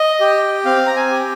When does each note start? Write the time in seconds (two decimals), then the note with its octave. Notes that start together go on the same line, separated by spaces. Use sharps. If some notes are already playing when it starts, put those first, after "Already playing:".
Already playing: D#5
0.20 G4
0.65 C4 F5
0.87 A#5
0.96 G#5
1.11 G4